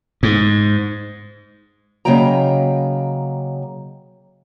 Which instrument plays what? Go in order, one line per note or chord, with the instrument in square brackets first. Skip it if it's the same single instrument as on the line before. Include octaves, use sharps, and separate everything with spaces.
[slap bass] G#2
[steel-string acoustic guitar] C#3 F#3 A#3 D#5 G5 A#5